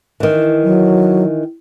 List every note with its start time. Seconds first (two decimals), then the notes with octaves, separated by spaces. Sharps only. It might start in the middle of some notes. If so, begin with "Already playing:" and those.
0.20 D#3 E3
0.63 F#3